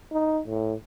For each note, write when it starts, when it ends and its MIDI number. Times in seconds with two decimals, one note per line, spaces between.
0.12 0.41 63
0.47 0.74 45